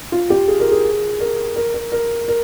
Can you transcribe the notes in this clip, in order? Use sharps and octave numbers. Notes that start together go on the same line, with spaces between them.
F4
G4
G#4
A#4
G#4
A#4
A#4
A#4
A#4
A#4